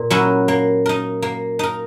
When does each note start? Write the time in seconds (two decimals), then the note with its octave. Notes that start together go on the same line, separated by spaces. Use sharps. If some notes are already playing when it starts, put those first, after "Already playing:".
Already playing: A#2
0.10 F#3 C#4 E4 A#4
0.48 A#3
0.86 D#4 A#4
1.22 A#3
1.59 D#4 A#4